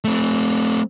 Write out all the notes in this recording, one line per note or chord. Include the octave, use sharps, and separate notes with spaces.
A3 C4